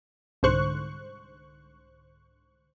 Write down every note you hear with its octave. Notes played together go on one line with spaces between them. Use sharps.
C2 G#2 D3 C5 C#6 F#6